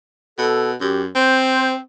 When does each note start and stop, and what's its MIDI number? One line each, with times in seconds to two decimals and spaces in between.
0.38 0.75 47
0.38 0.70 69
0.81 1.08 42
0.81 1.02 67
1.15 1.79 60
1.15 1.76 72